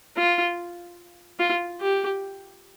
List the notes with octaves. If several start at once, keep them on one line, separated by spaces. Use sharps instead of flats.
F4
F4
G4